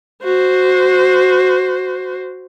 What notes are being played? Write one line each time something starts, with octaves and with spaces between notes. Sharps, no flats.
F#4 C5